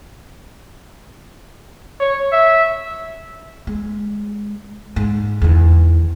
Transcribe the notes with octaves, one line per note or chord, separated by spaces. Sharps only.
C#5
E5
G#3
G#2
E2 D#3